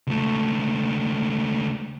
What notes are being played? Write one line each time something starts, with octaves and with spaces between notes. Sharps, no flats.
C#2 A3